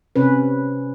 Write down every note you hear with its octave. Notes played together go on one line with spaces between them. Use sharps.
C3 C#4 B4